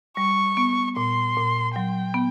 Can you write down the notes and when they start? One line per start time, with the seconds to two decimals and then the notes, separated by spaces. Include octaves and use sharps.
0.17 G3 C#6
0.57 B3
0.96 A#2 C6
1.37 A#2
1.75 F#3 G5
2.14 B3